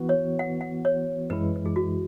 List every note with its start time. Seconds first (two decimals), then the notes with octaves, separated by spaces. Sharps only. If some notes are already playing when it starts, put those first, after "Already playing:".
Already playing: E3 B3 F#4
0.09 C#5
0.39 F#5
0.61 F#5
0.85 C#5
1.30 F#2 E3 G#3 E4 B4
1.56 B4
1.66 G#4
1.76 F#4